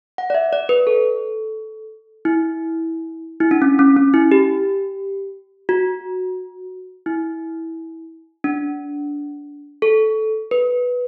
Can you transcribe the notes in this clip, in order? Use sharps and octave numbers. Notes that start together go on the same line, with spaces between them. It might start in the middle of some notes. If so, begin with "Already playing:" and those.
F#5
D5
E5
D5
B4
A4
E4
E4
D4
C#4
C#4
C#4
E4
G4
F#4
E4
D4
A4
B4